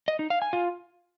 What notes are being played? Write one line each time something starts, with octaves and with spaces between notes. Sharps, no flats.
D#5
D#4
F5
G#5
F4